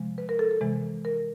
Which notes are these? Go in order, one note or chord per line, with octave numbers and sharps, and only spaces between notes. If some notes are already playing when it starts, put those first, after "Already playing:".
Already playing: C3 F3 G#3
B4
A#4
A4
A4
C3 E3 G#3
A#4